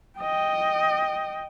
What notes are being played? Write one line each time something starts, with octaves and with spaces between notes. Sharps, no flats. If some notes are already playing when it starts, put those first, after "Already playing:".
D#5 G5